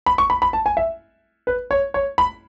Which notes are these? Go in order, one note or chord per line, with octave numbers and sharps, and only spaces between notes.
B5
C#6
B5
B5
A5
G#5
E5
B4
C#5
C#5
B5